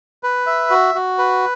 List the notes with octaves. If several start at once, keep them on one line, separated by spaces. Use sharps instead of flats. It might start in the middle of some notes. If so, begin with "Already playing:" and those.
B4
E5
F#4
F#4
B4